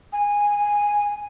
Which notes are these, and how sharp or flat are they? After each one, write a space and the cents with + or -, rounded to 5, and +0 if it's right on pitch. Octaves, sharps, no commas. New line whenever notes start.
G#5 -10